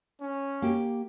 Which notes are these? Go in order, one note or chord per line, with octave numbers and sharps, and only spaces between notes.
C#4
A#3 G4